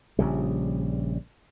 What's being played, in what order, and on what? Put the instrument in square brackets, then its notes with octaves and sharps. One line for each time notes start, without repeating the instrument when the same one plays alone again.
[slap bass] A#1 C#3 G3